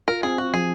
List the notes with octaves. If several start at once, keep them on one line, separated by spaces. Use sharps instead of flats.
F4 A#4
C4 G#4
F4 F#4
F3 G#4